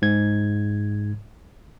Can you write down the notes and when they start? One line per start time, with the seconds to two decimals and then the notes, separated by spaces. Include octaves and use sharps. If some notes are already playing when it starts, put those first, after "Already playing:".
0.02 G#2 G#6